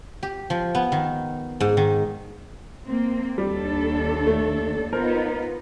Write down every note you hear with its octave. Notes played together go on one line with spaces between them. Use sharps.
G4
F3
B3
D#3
G#2
D#3
A#3 C4
D#2 G3 D4 A4
A3
B3 D#4 F4 A#4 C5